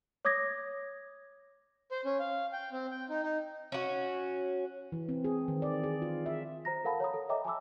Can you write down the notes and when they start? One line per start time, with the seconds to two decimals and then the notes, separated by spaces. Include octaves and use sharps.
0.25 C#5 D6 D#6 G#6 A#6
1.92 C5
2.05 C#4
2.19 F5
2.52 G5
2.72 C4
2.91 G5
3.09 D#4
3.23 D#4
3.72 C#4 F#4
4.92 E3
5.09 C4
5.24 G#4
5.48 D#3
5.62 D5
5.83 G#4
6.02 F4
6.26 E5
6.65 C5 A#5 A#6
6.85 A4 A#4 F5 F#5 A5 B5
7.00 C#5 A#5 D#6
7.14 A4
7.29 C#5 D#5 E5 G5 A#5 D6
7.45 G#5 A5 B5 D6 E6